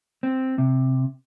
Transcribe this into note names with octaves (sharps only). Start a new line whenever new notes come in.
C4
C3